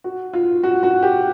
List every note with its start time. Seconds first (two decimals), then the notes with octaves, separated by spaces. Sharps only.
0.04 F#4
0.33 F4
0.63 F#4
0.83 F#4
1.03 G4